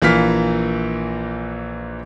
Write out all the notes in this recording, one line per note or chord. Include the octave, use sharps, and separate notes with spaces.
A#1 E3 A#3 F4 F6 B6